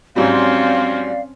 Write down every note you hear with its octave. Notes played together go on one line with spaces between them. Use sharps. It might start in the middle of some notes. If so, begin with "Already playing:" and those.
G#2 F#3 G3 C4 C#4 D5 F5